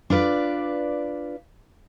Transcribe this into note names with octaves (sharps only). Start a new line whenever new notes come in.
D4 F4 B4 D5